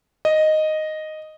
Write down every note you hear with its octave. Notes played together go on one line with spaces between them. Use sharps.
D#5